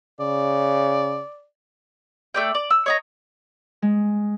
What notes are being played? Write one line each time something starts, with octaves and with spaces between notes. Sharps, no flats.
C#3 D5
A3 D5 G5
D5
E6
C#5 D#5 A#5
G#3